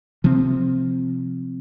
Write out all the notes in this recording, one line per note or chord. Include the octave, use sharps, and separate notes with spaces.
C3 F3 C4